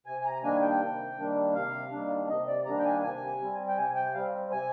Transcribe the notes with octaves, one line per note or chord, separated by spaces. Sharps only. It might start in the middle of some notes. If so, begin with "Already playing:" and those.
C3 G#5
G#5
A#5
D#3 G3 A#3 D4 G#5
G5
C3
D#3 G3 A#3 D4
C3 F5
D#3 G3 A#3 D4
C3 D#5
D5
D#3 G3 A#3 D4 A#5
G5
G#5
C3 G#5
G3 C4
G5
C3 G#5
G5
G3 C4 F5
C3 G#5